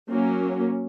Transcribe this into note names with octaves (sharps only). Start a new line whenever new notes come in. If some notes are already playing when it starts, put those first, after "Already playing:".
F#3 A#3 C#4